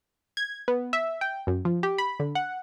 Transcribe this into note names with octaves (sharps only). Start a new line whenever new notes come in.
G#6
B3
E5
G5
F#2
F3
G4
B5
D3
F#5